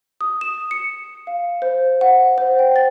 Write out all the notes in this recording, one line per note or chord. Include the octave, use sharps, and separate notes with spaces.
D#6
E7
C#7
F5
C5
F#5
C5
G5
A6